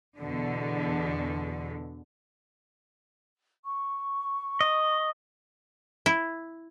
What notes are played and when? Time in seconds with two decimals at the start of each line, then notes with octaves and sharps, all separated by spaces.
0.17 E2 B2 D3
3.64 C#6
4.61 D#5
6.06 E4